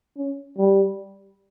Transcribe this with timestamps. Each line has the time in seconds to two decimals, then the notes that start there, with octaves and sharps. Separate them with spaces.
0.18 C#4
0.58 G3